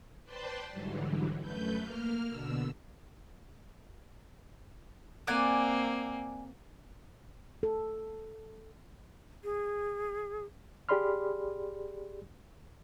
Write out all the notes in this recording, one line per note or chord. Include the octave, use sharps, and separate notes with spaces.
B4 C5 D5 G5 A5 C6
G#2 D3 E3 F#3 G3
F#2 A3 B4 G6
A#3 F6
B2 D3 E6
A#3 C4 D5 F#5 G#5
A4
G#4
G4 G#4 D5 B5 C6 F6